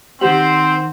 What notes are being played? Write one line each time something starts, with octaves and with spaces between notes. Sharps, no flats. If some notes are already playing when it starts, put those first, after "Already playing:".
D#3 C4 G4 C5 F#5